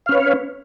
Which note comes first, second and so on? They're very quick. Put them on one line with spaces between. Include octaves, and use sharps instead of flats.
F5 C#4 B4 C#5